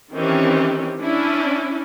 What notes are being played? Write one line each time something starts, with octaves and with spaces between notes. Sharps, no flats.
D#3 E3 C4 C#4 G4
C#4 D4 E4